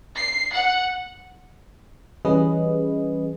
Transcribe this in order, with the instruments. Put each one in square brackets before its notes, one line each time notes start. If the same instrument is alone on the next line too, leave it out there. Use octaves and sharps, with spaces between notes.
[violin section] C7
F#5
[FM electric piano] E3 G3 C#4 G#4 B4 D#5